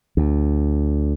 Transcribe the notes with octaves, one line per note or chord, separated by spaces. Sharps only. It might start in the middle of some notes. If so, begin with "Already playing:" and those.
D2